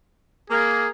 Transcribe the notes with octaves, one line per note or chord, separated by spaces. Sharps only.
A#3 G#4